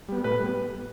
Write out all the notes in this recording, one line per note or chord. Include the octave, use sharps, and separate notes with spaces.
G3 B3
A2 B4
G3 B3